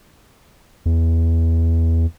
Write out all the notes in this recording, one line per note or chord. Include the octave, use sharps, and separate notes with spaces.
E2